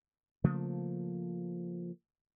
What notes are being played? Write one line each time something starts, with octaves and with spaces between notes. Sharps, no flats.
C#3 F3 A3 A#3